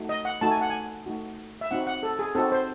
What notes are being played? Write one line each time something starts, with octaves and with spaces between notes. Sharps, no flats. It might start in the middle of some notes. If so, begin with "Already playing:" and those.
Already playing: A3 D#4 F#4
D#5
F#5
A3 D#4 F#4 A5
G#5
F#5
G#5
A3 D#4 F#4
E5
C4 D#4 F#4 F#5
F#5
A4
G#4
C4 D#4 F#4 A4
C5